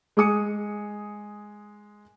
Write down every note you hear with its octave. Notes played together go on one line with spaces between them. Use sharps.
G#3 G#5 D#6 C#7